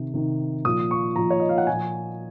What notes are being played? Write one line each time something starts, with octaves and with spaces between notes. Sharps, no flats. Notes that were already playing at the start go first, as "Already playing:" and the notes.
Already playing: C3 D#3
C3 D#3
A#2 F3 D#6
C#6
A#2 F3 A#5
C#5
D#5
F5
F#5
A#2 F3 G#5